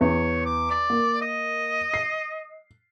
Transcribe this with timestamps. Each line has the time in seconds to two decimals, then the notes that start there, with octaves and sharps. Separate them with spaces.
0.01 E2 C#5
0.45 D6
0.71 D5
0.90 A#3
1.22 D#5
1.94 C7